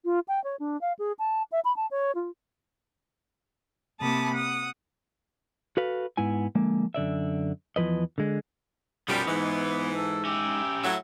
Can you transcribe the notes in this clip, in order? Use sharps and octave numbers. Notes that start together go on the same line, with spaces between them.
F4
G5
C#5
D4
F5
G#4
A5
E5
B5
A5
C#5
F4
C3 A#3 A5 B5 D#6
F#5 D#6
F#4 A4 B4 F5
G#2 B3 E4 G#5
D3 F3 G#3 A#3
F#2 D3 D5 E5
E2 E3 F3 B4 D#5
D3 G#3
B1 F#2 F3 G3 B3 G5
G#2 E3 G#3 D#4
A4
C#4 G4 E5
A2 F#3 E5